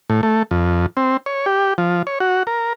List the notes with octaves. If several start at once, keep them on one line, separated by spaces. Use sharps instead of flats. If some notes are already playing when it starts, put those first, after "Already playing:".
A2
A3
F2
C4
C#5
G4
F3
C#5
F#4
A#4